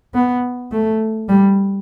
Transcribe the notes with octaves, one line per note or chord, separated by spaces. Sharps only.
B3
A3
G3